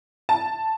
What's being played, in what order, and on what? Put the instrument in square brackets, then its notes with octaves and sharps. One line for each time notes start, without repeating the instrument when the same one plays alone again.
[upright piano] A5